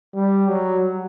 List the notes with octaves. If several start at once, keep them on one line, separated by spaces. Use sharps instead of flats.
G3
F#3